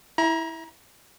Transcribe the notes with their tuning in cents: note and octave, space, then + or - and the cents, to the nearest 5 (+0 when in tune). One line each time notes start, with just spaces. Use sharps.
E4 -10 A#5 +30